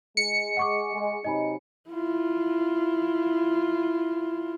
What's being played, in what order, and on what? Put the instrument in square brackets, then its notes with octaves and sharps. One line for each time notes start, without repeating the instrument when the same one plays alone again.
[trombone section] G#3 [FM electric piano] C#7
[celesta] F#5 C#6 D6
[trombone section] G#3
[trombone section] C3 F#3 D#4 [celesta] D#5 G#5 B5
[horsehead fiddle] E4 F4